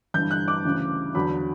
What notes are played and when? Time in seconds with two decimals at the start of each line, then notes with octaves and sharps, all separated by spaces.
0.14 G1 G2 E3 G6
0.31 F#6
0.48 D6
0.65 D2 C#3 E3
1.15 E2 D3 F#3 B5